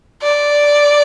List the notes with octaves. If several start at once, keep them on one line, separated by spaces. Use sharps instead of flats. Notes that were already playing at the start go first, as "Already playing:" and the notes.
D5